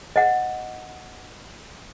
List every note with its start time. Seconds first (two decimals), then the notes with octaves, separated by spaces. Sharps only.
0.16 D#5 F#5